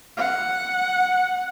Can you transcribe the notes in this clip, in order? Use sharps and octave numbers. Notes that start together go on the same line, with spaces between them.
F#5